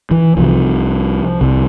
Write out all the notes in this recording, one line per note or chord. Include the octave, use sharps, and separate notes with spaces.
E3
C2 C3 F3
C2 C3